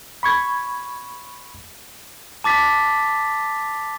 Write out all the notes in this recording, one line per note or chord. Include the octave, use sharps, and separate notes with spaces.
B5 C#6 G#6
A5 D6 A6 B6